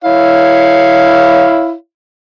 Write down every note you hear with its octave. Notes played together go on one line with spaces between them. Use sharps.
E4 C#5 F5